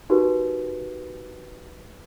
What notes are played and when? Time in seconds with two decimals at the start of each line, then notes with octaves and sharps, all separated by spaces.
0.10 D#4 F#4 G4 A#4 B4